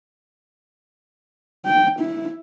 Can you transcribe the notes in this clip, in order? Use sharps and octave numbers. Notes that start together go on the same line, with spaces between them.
G5
E4